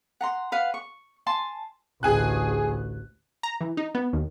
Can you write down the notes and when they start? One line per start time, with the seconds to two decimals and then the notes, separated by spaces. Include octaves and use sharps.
0.21 F#5 A#5 C6
0.52 B4 F5 F#5
0.74 C#6
1.27 G#5 A5 C6
2.03 A1 D2 G#4 G#5 F#6
3.43 A#5
3.61 E3
3.77 D#4
3.95 B3
4.13 D#2